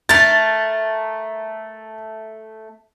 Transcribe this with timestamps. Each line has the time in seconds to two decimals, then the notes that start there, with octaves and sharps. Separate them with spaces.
0.09 A3 A#4 A6